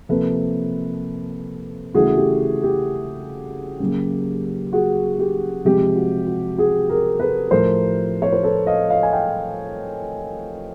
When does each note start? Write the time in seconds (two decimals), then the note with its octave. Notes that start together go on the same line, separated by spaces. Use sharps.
0.09 C3 F3 A#3 A4 B4
1.94 C#3 E3 A3 F#4 G#4
2.17 G4
2.64 G4
3.80 C#3 F#3 A#3
4.73 F#4 G#4
5.19 G4
5.65 C3 F3 G#3 G4
5.96 F#4
6.27 F#4
6.58 F#4 G#4
6.89 G#4 A#4
7.19 A4 B4
7.51 A2 F3 A3 A#4 C5
8.22 C#5
8.32 C5
8.43 A4 B4
8.67 D#5 F5
8.90 D#5 F5
9.03 G#5
9.13 F5 G5